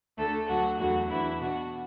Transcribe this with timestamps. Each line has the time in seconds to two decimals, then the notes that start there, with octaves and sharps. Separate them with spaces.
0.18 D2 D3 A3 A4
0.49 D2 D3 F#3 F#4
0.79 E2 D3 F#3 F#4
1.10 E2 E3 D4 E4
1.40 B2 B3 D4 F#4